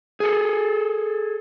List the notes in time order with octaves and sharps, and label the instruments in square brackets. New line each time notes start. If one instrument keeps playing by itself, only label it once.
[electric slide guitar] G#4 A4